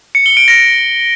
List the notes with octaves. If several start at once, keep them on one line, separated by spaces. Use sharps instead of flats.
C#7
G7
D7
A#6